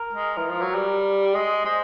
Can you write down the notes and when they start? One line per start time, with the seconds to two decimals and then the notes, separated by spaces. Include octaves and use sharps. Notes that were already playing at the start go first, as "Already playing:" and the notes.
Already playing: A#4
0.13 G#3
0.37 E3
0.49 F3
0.61 F#3
0.75 G3
1.35 G#3
1.65 G#3 C5